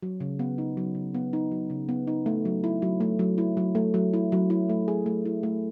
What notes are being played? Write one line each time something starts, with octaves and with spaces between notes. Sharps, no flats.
F#3
C#3
B3
D#4
F#3
C#3
B3
D#4
F#3
C#3
B3
D#4
A3
F#3
E4
F#3
A3
F#3
E4
F#3
A3
F#3
E4
F#3
E4
A3
G#4
A3
E4
A3